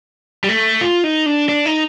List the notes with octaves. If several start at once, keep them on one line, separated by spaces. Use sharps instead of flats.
G3
A3
F4
D#4
D4
D4
D#4